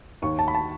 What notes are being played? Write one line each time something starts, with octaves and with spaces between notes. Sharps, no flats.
D#2 C#6
A5
B5
A5